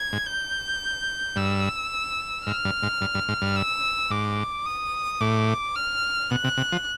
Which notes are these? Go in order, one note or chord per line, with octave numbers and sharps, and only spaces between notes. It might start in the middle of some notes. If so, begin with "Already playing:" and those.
Already playing: G#6
G#2
G6
G2 E6
G#2 F6
G2
G#2
G2
G2
G#2
G2
E6
G#2 D6
D#6
A2 D6
F6
B2 F#6
C3
C3
F3